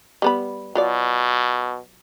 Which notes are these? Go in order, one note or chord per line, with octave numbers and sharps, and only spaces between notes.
G3 B3 B5
B2 F#3 F4 D5